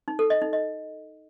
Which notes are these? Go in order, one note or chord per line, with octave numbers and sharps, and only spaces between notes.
D#4
A4
D#5
D#4
D#5